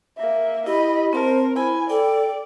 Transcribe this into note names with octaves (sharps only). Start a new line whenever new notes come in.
A#3 E5
E4 G4 D#5 B5
C4 A#4 C5 A5
E4 C5 G#5 B5
A4 D5 G5